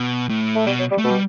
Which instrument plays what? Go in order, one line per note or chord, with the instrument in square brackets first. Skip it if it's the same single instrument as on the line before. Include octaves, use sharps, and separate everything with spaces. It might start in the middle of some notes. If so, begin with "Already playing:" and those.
Already playing: [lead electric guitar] B2
A2
[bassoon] A3
[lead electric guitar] B2 [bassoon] G3
[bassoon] F#3
G3
[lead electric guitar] A3
[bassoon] B2
[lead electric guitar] G3